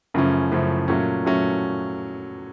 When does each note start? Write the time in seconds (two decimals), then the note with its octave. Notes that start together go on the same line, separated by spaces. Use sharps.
0.14 F#2 C#3 F3 A3 C#4
0.51 F#2 C#3 F3 A3 C#4
0.88 A#2 F#3 A3 C#4
1.25 A#2 F#3 A3 C#4